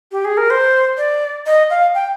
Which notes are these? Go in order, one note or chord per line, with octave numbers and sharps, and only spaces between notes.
G4
G#4
A#4
C5
D5
D#5
F5
G5